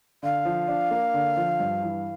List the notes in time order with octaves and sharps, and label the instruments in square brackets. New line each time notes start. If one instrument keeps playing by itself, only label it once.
[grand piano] D3 [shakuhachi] F5
[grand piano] F3
D4
A#3
D3
F3
G2
E3